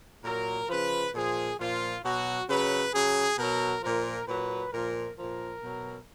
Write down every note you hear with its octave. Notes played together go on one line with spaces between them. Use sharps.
A#2 F#3 A#4
C#3 F3 B4
A#2 F3 G#4
A#2 F3 F4
B2 F#3 F#4
C#3 F#3 B4
C#3 F#3 G#4
B2 F#3 A#4
A#2 F3 A#4
A#2 F#3 B4
A#2 F3 A#4
A#2 F3 A#4
B2 F#3